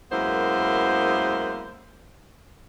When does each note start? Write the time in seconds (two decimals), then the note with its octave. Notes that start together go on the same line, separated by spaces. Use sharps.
0.11 F#2 G#3 A#3 B3 E4 C5